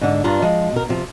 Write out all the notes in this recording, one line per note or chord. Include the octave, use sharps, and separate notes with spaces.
G#2 D3
G2 D4 F4 A#5
F3 G#3
B2 A#4
C3 F3